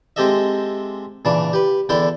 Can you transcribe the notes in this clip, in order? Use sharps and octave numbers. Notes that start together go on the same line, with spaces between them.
G#3 C4 G4 A4 D#5 E5
A#2 C#3 E3 D4 A5
G4 B4
E2 D3 D4 E4 A4 G5